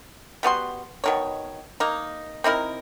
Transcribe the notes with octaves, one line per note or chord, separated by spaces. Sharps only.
G3 B3 F#4 C6
B2 D#3 C#5
A#3 D#4
C4 D#4 E4 A#4